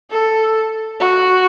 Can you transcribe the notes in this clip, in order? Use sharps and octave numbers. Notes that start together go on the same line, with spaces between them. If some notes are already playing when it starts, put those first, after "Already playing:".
A4
F#4